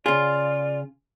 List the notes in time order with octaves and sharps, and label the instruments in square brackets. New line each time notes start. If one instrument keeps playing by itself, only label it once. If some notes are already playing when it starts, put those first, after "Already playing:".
[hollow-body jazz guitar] C#3 G#4 [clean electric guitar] F4 [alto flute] D5